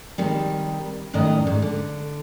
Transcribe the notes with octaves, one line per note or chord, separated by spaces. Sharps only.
C3 D#3 G3
F#2 A2 D#3 D5 D#5 A#5
G#2
D3